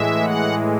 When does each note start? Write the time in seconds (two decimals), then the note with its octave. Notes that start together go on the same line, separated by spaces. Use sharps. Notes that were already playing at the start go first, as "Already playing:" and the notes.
Already playing: A2 E3 G#3 E5
0.22 F#5